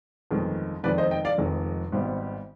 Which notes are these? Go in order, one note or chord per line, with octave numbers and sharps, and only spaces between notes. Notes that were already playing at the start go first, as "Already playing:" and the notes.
G1 F2 D#3 G#3
F1 F2 D#3 G#3 B4 D5
C5 D#5
D#5 G5
D5 F5
F1 F2 D#3 G#3
G#1 G#2 G3 B3